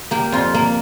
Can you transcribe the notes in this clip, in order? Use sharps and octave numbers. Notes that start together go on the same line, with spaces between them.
A#3 G4
F2 F4
A#3